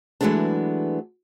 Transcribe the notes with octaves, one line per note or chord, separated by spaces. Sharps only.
E3 F#3 G#3 A3 B3 D4